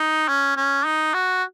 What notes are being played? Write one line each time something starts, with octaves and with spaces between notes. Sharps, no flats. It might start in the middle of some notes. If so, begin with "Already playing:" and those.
Already playing: D#4
C#4
C#4
D#4
F#4